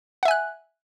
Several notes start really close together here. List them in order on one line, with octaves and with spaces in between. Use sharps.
F#5 E5 G#5 F#6